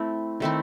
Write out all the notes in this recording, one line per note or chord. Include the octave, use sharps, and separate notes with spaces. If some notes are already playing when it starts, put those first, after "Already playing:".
Already playing: A3 C4 E4
D#3 A3 C4 E4